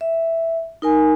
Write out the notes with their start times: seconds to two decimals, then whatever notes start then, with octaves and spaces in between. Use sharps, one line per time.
0.01 E5
0.82 D#4 A#4 G#5